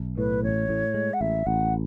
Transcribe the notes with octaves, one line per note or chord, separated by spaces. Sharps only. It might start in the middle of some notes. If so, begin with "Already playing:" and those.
Already playing: B1
A2 B4
A1 C#5
A2
G#3
F#5
A1 E5
A1 F#5